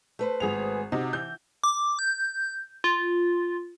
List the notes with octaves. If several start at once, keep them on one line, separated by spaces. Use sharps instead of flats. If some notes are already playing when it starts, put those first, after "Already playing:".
A3 B4 C5
G#1 G#4 F7
C3 D#4 F#4
E3 G6
D6
G6
F4